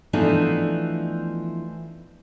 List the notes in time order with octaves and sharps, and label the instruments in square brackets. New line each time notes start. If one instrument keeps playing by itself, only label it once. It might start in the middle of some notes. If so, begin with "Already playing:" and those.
[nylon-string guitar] E3 F3 A3 B3 D4 D#4